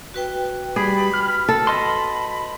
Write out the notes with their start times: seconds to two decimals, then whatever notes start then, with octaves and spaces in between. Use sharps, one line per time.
0.14 F#4 B4 G5
0.76 G3 G#4 B5
1.14 F6
1.49 A4
1.67 D#5 A5 B5 C6